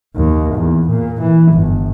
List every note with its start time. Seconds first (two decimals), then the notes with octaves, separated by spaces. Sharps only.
0.16 D#2
0.55 E2
0.89 A#2
1.22 E3
1.53 G1